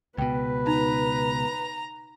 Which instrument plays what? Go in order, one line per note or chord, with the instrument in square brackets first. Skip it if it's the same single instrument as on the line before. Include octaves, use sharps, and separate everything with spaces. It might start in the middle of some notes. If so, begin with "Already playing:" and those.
[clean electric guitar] C#2 B2 [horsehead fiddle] B4 [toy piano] G5
[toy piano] D#4 [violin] A#5